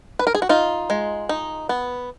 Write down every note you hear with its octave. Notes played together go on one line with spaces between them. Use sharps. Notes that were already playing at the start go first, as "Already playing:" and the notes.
B4
A#4
G#4
F#4
D#4 F4
G#3
D#4
B3